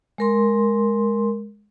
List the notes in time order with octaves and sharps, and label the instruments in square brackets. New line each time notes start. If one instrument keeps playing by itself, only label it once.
[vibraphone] G#3 A#4 C6